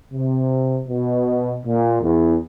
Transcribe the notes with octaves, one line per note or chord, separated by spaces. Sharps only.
C3
B2
A#2
E2